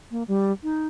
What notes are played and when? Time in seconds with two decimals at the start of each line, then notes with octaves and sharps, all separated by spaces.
0.11 A#3
0.28 G3
0.63 D#4